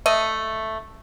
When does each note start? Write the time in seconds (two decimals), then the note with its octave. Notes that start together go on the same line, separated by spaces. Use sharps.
0.06 A3 D#5